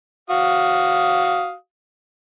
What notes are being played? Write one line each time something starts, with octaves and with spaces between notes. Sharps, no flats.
F#4 F5 D#6